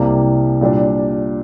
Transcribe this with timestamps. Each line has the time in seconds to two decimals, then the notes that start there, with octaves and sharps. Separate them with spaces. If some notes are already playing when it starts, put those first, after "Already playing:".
Already playing: C2 C3 G3 A#3
0.61 A#2 G3 D4